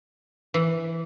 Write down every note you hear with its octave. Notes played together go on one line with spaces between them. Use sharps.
E3